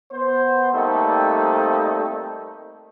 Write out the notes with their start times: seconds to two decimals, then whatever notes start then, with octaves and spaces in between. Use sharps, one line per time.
0.12 B3 C5
0.74 G3 A3 A#3 C4 D#4 A4